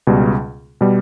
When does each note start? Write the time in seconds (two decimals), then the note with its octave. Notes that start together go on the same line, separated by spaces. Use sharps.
0.07 C#2 B2 G3
0.81 B2 G3